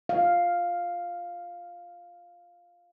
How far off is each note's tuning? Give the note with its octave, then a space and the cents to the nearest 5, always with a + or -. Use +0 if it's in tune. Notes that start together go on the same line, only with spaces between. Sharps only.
F5 +0